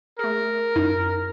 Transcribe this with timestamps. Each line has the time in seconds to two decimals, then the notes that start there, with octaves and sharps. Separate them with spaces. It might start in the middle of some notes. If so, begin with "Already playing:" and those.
0.19 A3 G#4 A#4
0.76 F#2 D#4 E4